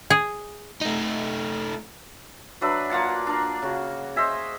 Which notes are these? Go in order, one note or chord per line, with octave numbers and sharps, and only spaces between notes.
G#4
A3 D#4
F#3 D4 B4 E5
A#3 F4 F#5 A5
D4 A#4
C#3 F#4
C5 D#5 E5 G#5